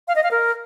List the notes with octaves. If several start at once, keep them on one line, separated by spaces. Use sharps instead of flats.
F5
D#5
F5
A#4